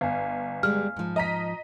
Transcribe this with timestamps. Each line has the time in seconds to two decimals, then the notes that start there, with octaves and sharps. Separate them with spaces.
0.01 G1 F5 G#5
0.63 G3 G#3 F6
0.96 G#2 F3
1.16 D#5 A#5 B6